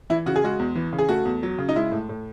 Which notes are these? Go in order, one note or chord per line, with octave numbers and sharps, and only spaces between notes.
E3 E4
C#3 F#4
G#4
G#3 F#4
E2
E3
C#3
G#4
A3 F#4
E2
F#3
C#3
D#4
G#3 E4
A2
A2